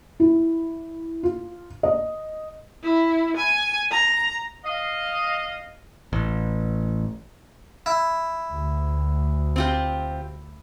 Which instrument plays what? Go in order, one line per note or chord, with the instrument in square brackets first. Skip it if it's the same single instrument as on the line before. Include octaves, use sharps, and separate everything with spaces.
[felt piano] E4
F4
D#5
[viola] E4
G#5
A#5
[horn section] D#5 F5
[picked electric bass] A1
[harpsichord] E4
[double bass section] D2
[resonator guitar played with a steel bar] C4 F4 G4